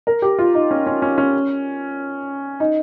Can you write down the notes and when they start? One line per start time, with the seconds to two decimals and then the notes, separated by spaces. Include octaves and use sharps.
0.07 A#4
0.22 G4
0.39 F4
0.54 D#4
0.71 C#4
0.86 C#4
1.02 C#4
1.18 C#4
2.60 D#4